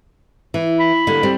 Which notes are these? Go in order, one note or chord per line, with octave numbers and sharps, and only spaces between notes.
E3
B5
D3 G3 A#3
G3 C4